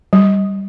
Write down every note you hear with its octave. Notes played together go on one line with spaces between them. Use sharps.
G3